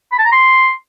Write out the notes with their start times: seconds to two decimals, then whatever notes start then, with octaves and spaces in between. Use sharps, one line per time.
0.12 B5
0.19 A5
0.25 A#5
0.32 C6